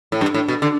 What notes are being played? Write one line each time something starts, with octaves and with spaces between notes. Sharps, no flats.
A2
G2
A2
B2
D3